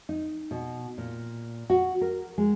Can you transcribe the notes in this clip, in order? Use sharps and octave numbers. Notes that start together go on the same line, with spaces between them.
D#4
B2
A#2
F#4
A#4
G#3